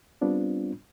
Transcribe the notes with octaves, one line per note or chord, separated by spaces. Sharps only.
G3 B3 C4 D4 F4